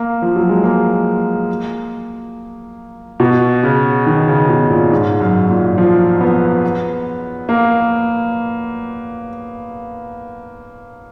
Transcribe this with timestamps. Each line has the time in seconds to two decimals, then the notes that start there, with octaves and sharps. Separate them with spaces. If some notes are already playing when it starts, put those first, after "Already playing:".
Already playing: A#3
0.22 F3
0.36 F#3
0.49 G#3
0.63 A#3
3.20 B2
3.63 C#3
4.07 D#3
4.27 C#3
4.49 B2
4.70 A#2
4.91 G#2
5.21 F#2
5.49 A#2
5.78 F3
6.21 B3
7.49 A#3